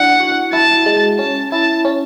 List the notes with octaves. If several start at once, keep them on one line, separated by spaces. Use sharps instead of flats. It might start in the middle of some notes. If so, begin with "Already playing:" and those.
Already playing: D4 E4 F#5
F#4
E4 A5
G#3
C#4 A5
E4 A5
C#4